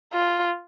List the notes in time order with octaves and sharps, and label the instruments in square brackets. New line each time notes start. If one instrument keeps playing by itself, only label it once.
[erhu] F4